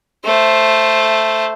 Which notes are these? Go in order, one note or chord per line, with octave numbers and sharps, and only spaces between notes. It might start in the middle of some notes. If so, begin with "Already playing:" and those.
A3 C5